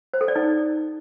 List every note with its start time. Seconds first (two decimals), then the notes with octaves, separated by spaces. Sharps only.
0.14 C5
0.21 A4
0.28 D5
0.35 D#4